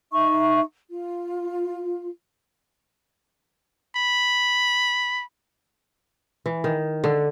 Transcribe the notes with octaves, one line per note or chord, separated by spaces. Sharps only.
D#4 E5 C#6
F4
B5
E3
D#3
D3